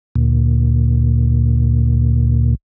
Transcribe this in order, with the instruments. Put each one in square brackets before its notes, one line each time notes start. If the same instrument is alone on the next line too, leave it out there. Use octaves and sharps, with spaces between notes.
[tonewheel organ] D2 A#2